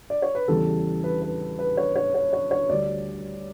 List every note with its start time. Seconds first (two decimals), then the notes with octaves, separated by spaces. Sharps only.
0.10 D5
0.22 C#5
0.35 B4
0.48 E2 C#3 E3 G3 A4
1.04 B4
1.22 B4
1.59 B4
1.77 C#5
1.96 C#5
2.14 C#5
2.33 C#5
2.51 C#5
2.69 D2 D3 G3 D5